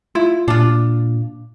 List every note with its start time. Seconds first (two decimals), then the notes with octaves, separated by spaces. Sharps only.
0.15 E4 F4
0.48 A#2 D4 F4